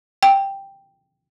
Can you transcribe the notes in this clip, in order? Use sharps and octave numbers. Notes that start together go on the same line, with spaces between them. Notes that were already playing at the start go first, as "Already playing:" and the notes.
G5